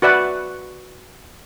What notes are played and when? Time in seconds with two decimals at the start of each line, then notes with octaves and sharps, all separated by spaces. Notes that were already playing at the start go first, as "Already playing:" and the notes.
0.02 F#4 B4 D5 E5 F#5